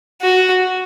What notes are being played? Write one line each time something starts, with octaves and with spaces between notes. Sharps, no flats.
F#4